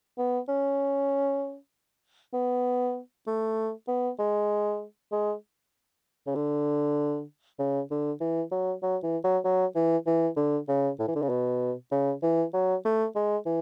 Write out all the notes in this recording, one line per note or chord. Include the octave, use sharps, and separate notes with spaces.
B3
C#4
B3
A3
B3
G#3
G#3
C#3
D3
C#3
D3
E3
F#3
F#3
E3
F#3
F#3
E3
E3
D3
C#3
A2
E3
D3
C#3
B2
C#3
E3
F#3
A3
G#3
E3